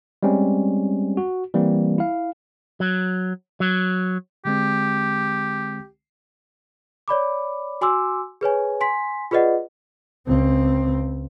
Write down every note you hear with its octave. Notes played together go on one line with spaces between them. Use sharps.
G3 G#3 C4 C#4
F#4
E3 G3 A#3 C4
E4 F5
F#3
F#3
D3 G#3 C4 G4
C#5 D5 B5 D6
F#4 G#5 C6 D6 E6
G#4 B4 C#5 G#5
G#5 C6 B6
F4 G#4 B4 D5 D#5 F#5
C#2 C4